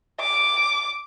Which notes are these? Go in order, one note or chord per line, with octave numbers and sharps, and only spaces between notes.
D6